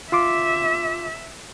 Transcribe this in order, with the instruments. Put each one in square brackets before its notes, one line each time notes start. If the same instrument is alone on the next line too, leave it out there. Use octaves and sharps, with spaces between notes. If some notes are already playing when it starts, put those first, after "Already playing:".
[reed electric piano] F4 C6 D6 [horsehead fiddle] E5